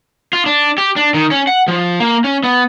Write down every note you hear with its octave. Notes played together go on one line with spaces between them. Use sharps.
F4
D4
G4
D4
D#3
C#4
F#5
F3
A#3
C#4
B3